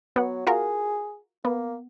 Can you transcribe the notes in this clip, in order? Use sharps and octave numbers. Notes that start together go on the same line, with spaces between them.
F#3 B3 F#5
F4 F#4 G#4 A#4
A#3 B3